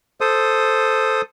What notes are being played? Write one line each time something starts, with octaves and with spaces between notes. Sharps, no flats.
A4 C5 D#6